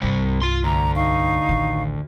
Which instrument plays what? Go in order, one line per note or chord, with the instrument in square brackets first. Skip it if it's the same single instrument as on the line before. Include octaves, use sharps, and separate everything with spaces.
[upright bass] C2 G2 [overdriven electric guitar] C3 G3
[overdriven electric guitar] F4 C6
[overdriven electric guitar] D2 [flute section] A#5
[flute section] D#4 F5 C#6
[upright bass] A1 D#3